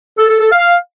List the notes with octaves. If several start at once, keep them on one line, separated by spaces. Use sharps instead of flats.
A4
A4
A4
F5